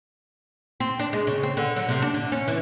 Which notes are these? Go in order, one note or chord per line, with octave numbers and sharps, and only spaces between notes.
C4
D4
G#3
C#3
C4
D3
F#3
C3
D4
D3
C#4
E3